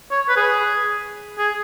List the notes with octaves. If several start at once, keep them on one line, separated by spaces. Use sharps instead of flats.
C#5
B4
G#4
G#4